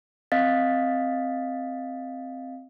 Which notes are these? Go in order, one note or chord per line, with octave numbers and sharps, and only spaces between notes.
C4 D#5 F5 A6 B6